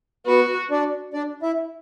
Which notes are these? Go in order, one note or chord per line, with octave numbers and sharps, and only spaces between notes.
B3 F#4 B4
D4 D5
D4 D5
E4 E5